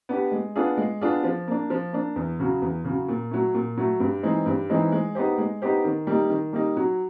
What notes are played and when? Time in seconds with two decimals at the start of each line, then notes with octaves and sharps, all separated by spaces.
0.09 B3 D4 G4
0.32 G#3
0.56 B3 D4 F4 G#4
0.77 G#3
1.01 B3 D4 F4 G#4
1.23 F3
1.47 A#3 D4
1.70 F3
1.92 A#3 D4
2.16 E2
2.40 C#3 F#3
2.62 E2
2.85 C#3 F#3
3.08 A#2
3.31 F#3 A3
3.54 A#2
3.77 F#3 A3
4.00 G2
4.23 E3 G#3 C4 D#4
4.46 G2
4.70 E3 G#3 C4 D#4
4.92 G#3
5.15 B3 D#4 G4 C5
5.38 G#3
5.62 B3 D#4 G4 C5
5.85 D#3
6.07 G3 A#3 D#4
6.30 D#3
6.53 G3 A#3 D#4
6.77 F#3